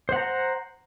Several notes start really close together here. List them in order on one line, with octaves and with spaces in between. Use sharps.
C5 F#5 A#5